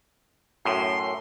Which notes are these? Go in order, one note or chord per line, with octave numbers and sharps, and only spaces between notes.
F#2 A2 C6